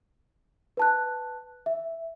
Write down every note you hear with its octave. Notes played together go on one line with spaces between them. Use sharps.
B4 A5 F#6
E5